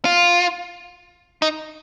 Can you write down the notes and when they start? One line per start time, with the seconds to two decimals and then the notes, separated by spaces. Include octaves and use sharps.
0.05 F4
1.42 D#4